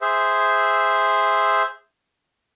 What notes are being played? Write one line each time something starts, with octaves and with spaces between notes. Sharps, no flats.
G#4 C5 E5